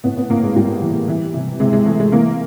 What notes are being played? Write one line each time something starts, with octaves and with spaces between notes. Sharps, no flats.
A2 B3
B3
A2 A#3
G#3
A2 G3
E3
E3
C3
C3 G#3
G#3
E3 A3
G#3
E3 A#3